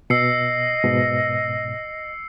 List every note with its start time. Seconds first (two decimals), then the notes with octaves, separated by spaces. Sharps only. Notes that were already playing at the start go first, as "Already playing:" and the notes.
0.10 B2 D#5 E6 C7 C#7
0.84 G#2 B2